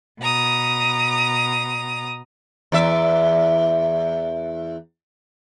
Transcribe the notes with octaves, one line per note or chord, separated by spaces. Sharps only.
B2 A#5 D#6
E2 D5 E5